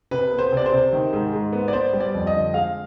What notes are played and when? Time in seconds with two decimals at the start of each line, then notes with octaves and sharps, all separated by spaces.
0.11 C3 B4
0.32 B3
0.39 C5
0.52 C3 D5
0.66 C5
0.73 C3
0.93 D#3
1.13 G#2
1.33 G#2
1.53 B3
1.68 D5
1.73 B3 C5
1.93 G3
2.00 D5
2.14 F2
2.27 D#5
2.35 D3
2.54 G#3 F5